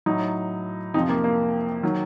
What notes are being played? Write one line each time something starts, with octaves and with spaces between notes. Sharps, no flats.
A2 F#3 D#4
F2 C3 F3 D#4
A#3
A#3
D#3 F#3